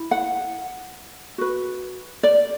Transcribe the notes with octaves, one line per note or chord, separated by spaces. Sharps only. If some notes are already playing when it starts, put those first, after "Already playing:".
Already playing: E4
F#5
F#4 B4
D5